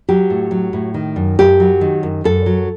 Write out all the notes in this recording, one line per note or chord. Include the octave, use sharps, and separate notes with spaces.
F#3 G4
A2
F#3
A2
D#3
F#2
F#2 G4
F#3
D#3
F#2
F#2 A4
F#3